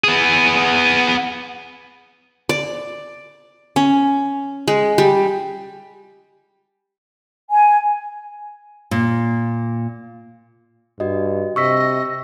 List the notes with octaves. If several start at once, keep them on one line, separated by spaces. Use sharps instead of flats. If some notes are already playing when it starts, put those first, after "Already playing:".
B3 G#4
D5
C#4
G#3
G3
G#5
A#2
G2 F#4 D#5
C3 D#5 C#6 E6 B6